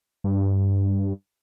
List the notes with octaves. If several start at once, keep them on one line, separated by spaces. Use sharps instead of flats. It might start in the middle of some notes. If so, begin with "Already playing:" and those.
G2